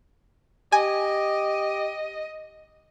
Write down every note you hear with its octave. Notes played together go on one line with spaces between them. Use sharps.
G4 D#5 G#5